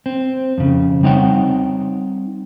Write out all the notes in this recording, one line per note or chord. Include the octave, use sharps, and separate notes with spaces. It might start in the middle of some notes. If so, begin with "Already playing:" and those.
C4
F2 C#3
G3 C4 D#4 C#5 F#5 G5